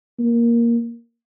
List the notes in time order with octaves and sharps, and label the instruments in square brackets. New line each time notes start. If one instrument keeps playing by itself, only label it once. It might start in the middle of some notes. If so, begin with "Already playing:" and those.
[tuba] A#3